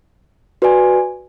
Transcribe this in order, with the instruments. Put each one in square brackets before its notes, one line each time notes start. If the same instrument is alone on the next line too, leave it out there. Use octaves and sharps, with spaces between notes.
[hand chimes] F#4 B4 D5 G#5